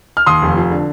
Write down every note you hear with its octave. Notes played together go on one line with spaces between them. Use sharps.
F6
D#2 C6 D#6
F1
F3
D3